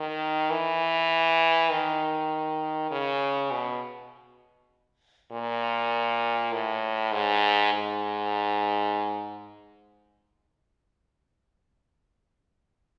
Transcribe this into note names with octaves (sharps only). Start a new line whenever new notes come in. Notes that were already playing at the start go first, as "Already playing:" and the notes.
Already playing: D#3
E3
D#3
C#3
B2
A#2
A2
G#2
G#2